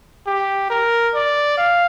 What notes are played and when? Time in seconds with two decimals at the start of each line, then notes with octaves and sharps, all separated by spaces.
0.27 G4
0.70 A#4
1.15 D5
1.58 F5